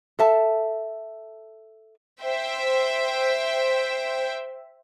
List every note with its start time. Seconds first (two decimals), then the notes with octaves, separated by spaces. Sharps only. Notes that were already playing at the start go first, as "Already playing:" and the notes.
0.19 A4 E5 A5
2.21 C5 E5 G5